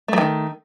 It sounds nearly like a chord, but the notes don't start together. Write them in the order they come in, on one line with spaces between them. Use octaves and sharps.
A3 F#3 D#3